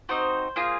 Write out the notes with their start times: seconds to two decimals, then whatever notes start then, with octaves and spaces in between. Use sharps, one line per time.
0.09 C4 D#4 F#4 C5
0.56 A#3 F4 G#4